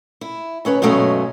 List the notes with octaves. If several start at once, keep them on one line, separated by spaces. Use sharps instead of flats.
E4
D#2 C#4 B4 C#5
G2 B2 F#3 G#3 A3 C#4